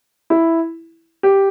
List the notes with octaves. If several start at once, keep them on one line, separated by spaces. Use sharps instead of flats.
E4
G4